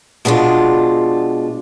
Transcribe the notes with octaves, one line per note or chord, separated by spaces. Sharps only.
B2 G#3 D4 F4